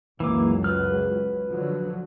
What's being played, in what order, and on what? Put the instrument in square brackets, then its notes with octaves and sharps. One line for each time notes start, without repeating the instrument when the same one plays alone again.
[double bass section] C#2 F#2 F#3 [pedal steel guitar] E3 A#3 D6
[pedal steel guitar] B4 F6
[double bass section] D3 F3 F#3